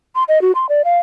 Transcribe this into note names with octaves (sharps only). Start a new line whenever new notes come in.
C6
D#5
F#4
C6
D5
F5